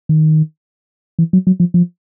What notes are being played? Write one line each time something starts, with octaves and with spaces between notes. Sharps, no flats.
D#3
E3
F#3
F#3
F3
F3